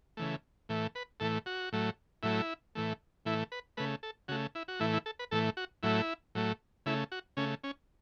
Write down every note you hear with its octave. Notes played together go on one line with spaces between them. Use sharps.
C#3 E3 A3
A2 E3 A3
B4
A2 E3 A3 A4
F#4
A2 F#3 A3
A2 F#3 A3 E4
A2 E3 A3
A2 E3 A3 E4
B4
C#3 A3 B4
A4
C#3 A3 F#4
E4
F#4
A2 E3 A3 E4
E4
A4
B4
A2 E3 A3 A4
F#4
A2 F#3 A3 E4
A2 F#3 A3
C#3 A3 E4
F#4
C#3 A3 C#4
C#4